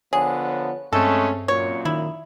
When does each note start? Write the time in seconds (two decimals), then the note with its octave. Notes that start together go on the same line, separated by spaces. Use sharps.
0.13 D3 F3 B3 G#4 C#5
0.93 G2 G#3 A3 C4 C#4 A4
1.48 F#2 A#2 C#5
1.85 D#3 E4